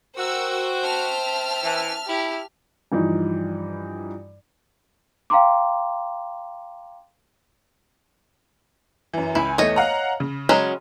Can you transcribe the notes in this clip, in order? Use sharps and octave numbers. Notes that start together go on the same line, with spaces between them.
F#4 A#4 C5 F#5 G5 E6
E5 A5 F6
E3
E4 G4
G2 E3 F3 D#4
F5 G5 A#5 C6 D6
F#2 E3
C#2 E4 G#5
E2 E3 A3 C#5 D#5
F5 F#5 A#5
C#3
F#3 G#3 C#4